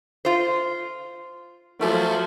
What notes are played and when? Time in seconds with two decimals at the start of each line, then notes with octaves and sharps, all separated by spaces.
0.25 F4 C5
1.82 F3 F#3 A3 F#4